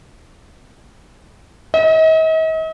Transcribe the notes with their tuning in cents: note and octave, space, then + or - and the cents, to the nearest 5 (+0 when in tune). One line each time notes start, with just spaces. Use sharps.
D#5 +45